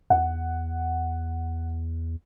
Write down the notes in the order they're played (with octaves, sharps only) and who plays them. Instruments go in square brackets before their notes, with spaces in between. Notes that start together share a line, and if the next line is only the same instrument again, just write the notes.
[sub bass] E2 [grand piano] F#5